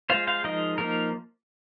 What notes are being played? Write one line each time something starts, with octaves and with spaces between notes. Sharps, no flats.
G#3 F4 C5 F5
C5 F5
F3 G#3 D#4 A#4 D#5
F3 A#3 D#4 A#4